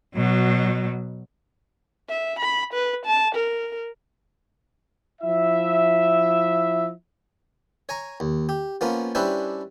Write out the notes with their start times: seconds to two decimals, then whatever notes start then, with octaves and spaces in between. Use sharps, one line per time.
0.15 B2 F#3
2.10 E5
2.40 B5
2.74 B4
3.06 A5
3.36 A#4
5.22 F3 E4 E5
7.89 C#5 G#5 A#5
8.20 D#2
8.49 G4
8.81 F3 A#3 B3 C#4 F4
9.15 G3 C#4 D4 E4 B4 C5